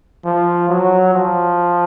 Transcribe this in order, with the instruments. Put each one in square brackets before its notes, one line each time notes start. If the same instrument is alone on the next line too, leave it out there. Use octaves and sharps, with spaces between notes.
[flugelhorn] F3
F#3
F3